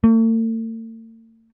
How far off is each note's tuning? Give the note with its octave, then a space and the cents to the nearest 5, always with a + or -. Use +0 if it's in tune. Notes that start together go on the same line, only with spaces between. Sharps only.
A3 +45